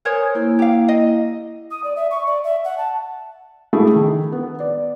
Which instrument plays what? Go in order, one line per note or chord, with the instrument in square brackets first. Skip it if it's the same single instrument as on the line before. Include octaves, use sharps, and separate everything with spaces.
[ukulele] A#4 C5 C#5 [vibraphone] G#5 D#6
[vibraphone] A#3 E4
[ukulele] G4 F5
D#5
[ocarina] D#6
D5
E5
C#6
D5
E5
F#5
A5
[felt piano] A3 E4 G4 G#4
D#3
B3
D5